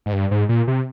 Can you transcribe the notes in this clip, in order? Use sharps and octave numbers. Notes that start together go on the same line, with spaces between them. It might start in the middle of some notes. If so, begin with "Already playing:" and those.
G#2
G2
G#2
A#2
C3